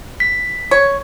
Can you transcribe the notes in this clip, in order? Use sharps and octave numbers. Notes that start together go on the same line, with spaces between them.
B6
C#5